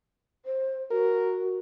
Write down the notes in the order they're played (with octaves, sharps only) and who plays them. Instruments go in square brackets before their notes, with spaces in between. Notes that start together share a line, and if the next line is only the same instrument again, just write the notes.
[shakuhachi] C5
[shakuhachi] F#4 [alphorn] A#4